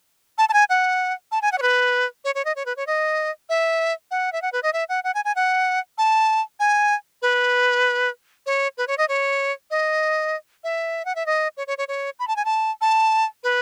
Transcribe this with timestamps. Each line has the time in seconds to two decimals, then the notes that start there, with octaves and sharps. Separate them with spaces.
0.38 A5
0.49 A5
0.53 G#5
0.70 F#5
1.32 A5
1.42 G#5
1.52 F#5
1.58 C#5
1.62 B4
2.24 C#5
2.35 C#5
2.45 D#5
2.56 C#5
2.66 B4
2.77 C#5
2.87 D#5
3.49 E5
4.11 F#5
4.33 E5
4.42 F#5
4.53 B4
4.63 D#5
4.73 E5
4.89 F#5
5.04 F#5
5.15 G#5
5.25 G#5
5.36 F#5
5.98 A5
6.60 G#5
7.22 B4
8.46 C#5
8.77 B4
8.87 C#5
8.98 D#5
9.09 C#5
9.71 D#5
10.64 E5
11.05 F#5
11.15 E5
11.26 D#5
11.57 C#5
11.67 C#5
11.78 C#5
11.88 C#5
12.19 B5
12.28 A5
12.36 G#5
12.45 A5
12.81 A5
13.43 B4